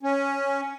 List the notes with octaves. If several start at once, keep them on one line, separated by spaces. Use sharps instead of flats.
C#4